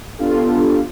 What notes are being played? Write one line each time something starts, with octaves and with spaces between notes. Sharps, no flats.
B3 D4 F4 G4 A4